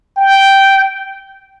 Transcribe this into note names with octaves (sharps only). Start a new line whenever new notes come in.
G5